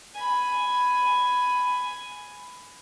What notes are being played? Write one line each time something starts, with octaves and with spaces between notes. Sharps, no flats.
G#5 B5